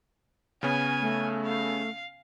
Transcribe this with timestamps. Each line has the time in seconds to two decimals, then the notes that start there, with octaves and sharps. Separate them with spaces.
0.63 C#3 B3 C#4 G#5
1.01 A3
1.46 F5